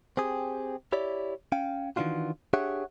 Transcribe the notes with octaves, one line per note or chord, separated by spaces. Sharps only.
C4 G4 G#4
E4 G4 C#5 D5
C#4 F5 G5
D#3 E3 A#3 D4 F4 F#4
D4 G4 G#4 C#5 E5 F#5